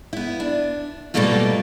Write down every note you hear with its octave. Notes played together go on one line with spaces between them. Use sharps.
B3 E4
D4
B2 F#3 G3 A3 A#3 F4